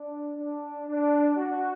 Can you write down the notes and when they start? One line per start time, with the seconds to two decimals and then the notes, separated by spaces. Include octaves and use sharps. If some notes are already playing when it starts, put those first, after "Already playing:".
Already playing: D4
0.36 D4
0.87 D4
1.37 F#4